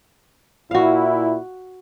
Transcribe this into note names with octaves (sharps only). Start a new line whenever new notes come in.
A#2 E4 F#4 F5